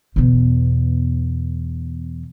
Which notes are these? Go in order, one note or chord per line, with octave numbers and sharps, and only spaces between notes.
E2 B2